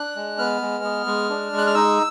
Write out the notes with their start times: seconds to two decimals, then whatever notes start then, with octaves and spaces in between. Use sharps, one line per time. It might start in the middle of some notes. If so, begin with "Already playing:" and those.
Already playing: D4 F#6
0.16 G#3
0.38 B3 F6
0.61 G#3
0.84 B3
1.07 G#3
1.30 D4
1.53 G#3
1.58 F#6
1.67 F6
1.75 D#4 E6